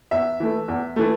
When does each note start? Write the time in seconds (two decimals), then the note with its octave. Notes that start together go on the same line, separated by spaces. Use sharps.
0.11 E2 E5
0.40 E3 A3
0.68 E2
0.96 E3 A3